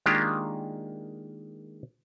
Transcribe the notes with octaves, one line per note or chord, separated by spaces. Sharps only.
D#3 G#3 A#3 D4 F4 G4